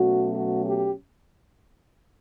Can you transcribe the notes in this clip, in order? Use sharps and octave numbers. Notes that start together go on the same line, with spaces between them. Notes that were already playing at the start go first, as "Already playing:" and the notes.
Already playing: B2 F#3 A3 C#4 F#4
F#4
G4